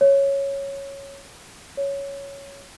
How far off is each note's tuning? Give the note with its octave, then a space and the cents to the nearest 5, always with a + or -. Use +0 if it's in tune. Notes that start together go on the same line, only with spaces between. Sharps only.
C#5 -5
C#5 +5